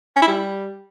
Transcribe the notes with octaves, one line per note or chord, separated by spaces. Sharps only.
C#4
E4
G3